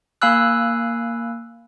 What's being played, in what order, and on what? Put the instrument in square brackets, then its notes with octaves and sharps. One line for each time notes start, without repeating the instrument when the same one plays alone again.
[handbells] A#3 F5 G#5 B5 E6 F#6